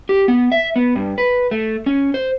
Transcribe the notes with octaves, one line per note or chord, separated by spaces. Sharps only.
G4
B3
E5
B3
G2
B4
A3
C#4
C5